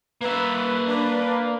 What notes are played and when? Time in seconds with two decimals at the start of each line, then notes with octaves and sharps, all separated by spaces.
0.21 A#3 B4 E5
0.87 D4 B4